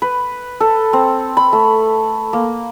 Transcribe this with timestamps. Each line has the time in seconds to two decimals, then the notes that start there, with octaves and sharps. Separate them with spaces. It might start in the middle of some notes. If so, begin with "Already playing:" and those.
0.02 B4
0.60 A4
0.93 C4
1.37 B5
1.53 A3
2.33 A#3